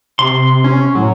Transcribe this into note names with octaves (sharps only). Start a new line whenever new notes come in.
C3 C6
C#4
A2 F#3